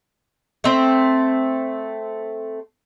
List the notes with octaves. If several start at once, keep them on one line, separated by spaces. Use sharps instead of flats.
A3 C4